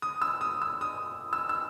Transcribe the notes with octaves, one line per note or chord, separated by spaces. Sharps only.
D#6
E6
D#6
E6
D#6
E6
E6